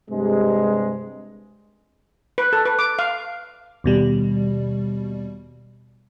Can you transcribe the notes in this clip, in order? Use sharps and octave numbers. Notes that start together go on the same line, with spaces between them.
G2 C3 G#3
B4
A4
B4
D6
F5
D#2 B2 G3